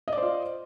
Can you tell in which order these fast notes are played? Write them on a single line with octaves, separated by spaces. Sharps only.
D#5 D5 C5 F4